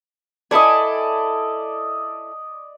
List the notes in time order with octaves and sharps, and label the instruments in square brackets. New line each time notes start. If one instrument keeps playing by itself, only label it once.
[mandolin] E4 A4 G#5 [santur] D5 D#5